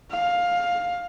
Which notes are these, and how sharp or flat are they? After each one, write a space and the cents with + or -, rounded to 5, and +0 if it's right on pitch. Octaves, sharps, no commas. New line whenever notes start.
F5 +15